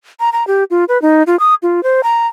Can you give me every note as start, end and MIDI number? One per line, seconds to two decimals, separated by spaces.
0.20 0.30 82
0.33 0.46 82
0.47 0.64 67
0.71 0.85 65
0.89 1.01 71
1.02 1.23 63
1.27 1.39 65
1.39 1.55 87
1.63 1.83 65
1.83 2.01 72
2.03 2.27 82